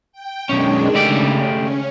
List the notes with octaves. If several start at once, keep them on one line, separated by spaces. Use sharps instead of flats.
G5
B1 D#3 G#3 C#4 D4
C#3 A3 G4 D5
C#4